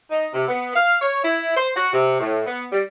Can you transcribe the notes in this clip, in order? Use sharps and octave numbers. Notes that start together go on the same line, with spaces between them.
D#4
C3
B3
F5
C#5
E4
C5
F#4
C3
A2
B3
G3